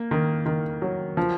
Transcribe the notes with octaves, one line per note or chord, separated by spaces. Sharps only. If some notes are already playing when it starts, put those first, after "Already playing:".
Already playing: A#3
D#3
D#3
F#3
F3